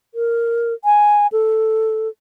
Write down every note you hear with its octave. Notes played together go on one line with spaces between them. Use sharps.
A#4
G#5
A4